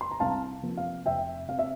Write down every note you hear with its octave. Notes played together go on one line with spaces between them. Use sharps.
C6
A#5
C2 F5 A5
C3 F3 A#3
F5
F1 E5 G5
C3 F5
E5